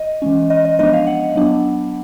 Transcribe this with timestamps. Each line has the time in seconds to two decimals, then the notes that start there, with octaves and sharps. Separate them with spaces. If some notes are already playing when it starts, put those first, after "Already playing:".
Already playing: D#5
0.22 E3 G#3 C#4
0.50 D#5
0.65 D#5
0.79 F3 G#3 B3 D4 D#5
0.93 F5
1.07 F#5
1.35 F#3 B3 D4